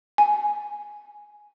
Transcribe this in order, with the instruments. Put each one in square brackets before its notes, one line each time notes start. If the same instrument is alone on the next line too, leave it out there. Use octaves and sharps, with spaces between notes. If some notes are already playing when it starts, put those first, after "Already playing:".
[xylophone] G#5